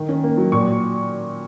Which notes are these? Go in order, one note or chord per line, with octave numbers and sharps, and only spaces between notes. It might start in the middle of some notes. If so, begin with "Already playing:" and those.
Already playing: D#3
C#4
A#3
F#3
A#2 C#6